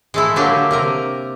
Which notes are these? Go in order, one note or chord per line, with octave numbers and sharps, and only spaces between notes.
G#3 A3 E4
D3 F#3 A#3 D4 G4 F5
C3 A#4 A#5